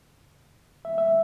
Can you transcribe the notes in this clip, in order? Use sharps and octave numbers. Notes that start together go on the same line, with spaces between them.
E5
E5